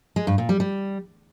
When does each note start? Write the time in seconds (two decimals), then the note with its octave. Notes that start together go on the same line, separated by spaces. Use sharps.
0.16 G#3
0.27 G2
0.38 A#2
0.49 G3
0.60 G3